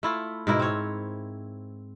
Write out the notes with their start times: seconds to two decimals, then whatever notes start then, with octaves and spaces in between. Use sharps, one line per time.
0.03 A3 E4 F4
0.47 G#2 B2 E4 A#4
0.59 C4 C#5